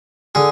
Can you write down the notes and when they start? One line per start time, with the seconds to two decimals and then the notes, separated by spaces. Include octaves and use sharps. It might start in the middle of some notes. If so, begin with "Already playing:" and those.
0.35 D3 G#4